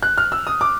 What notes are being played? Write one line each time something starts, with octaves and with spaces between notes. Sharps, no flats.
F#6
F6
E6
D#6
D6